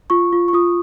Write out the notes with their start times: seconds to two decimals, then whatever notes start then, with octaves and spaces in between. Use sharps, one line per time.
0.10 F4 C#6
0.33 F4
0.48 C#6
0.53 F4 D#6